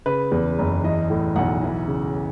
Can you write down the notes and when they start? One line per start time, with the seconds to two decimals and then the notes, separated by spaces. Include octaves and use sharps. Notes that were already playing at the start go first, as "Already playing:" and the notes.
0.06 C#3 B4
0.32 E2
0.58 F#1
0.84 E3 D#5
1.10 A2
1.36 B1 F#5
1.62 E3
1.88 C#3